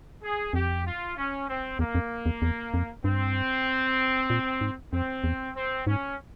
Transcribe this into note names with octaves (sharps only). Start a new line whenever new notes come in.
G#4
F2 G4
F4
C#4
C4
E2 A#3
F2
E2
E2
F2
G2 C4
A#2
G#2
F2 C4
E2
C4
G#2 C#4